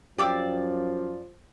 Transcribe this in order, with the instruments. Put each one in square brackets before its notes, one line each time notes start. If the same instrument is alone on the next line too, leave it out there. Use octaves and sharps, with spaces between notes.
[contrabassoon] F#2 [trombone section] F3 [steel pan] G4 F5 [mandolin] D5 D6 E6